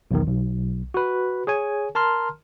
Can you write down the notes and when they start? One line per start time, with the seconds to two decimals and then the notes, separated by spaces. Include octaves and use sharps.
0.11 B1 E2 D#3
0.27 B1
0.94 F#4 B4
1.47 G#4 C#5 G#5
1.95 A#4 A5 A#5 C6 F6